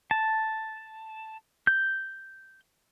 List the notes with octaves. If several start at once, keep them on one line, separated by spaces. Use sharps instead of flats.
A5
G6